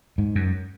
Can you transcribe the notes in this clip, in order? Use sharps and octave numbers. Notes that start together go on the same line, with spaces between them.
G#2
F#2